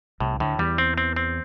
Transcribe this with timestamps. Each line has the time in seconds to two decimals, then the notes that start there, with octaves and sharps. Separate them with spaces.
0.20 C2 A2 C3
0.40 D2 A2 D3
0.58 E2 E3 G3
0.78 C4
0.98 C4
1.16 C4